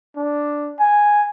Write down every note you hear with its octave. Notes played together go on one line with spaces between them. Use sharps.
D4
G#5